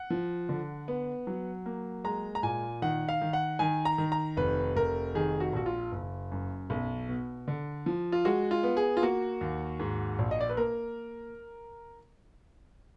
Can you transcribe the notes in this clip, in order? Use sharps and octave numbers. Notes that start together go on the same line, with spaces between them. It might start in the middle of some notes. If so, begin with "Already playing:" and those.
Already playing: F#5
F3
D3
B3
F#3
A#3
G#3 A#5
A#5
A#2 G#5
D#3 F#5
F5
D#3
F#5
D#3 G#5
A#5
D#3
A#5
F1 B4
F1 A#4
D#3 G#4
F#4
A#1 F#4
F4
F#1
F#2
B1
B2
D3
F3
F4
G#3 F#4
F4
B3
G#4
F4
A#3 F#4
D#2
G#2
A#1
D#5
D5
B4
A#3 A#4